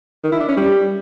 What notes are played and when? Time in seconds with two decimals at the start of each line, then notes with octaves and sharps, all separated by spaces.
0.24 D#3
0.32 E4
0.40 D4
0.49 C#4
0.57 G3